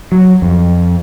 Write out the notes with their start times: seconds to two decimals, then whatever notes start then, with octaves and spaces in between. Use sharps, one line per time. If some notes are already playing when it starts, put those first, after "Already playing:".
0.12 F#3
0.42 F2